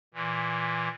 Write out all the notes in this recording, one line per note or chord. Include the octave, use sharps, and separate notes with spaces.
A#2 E3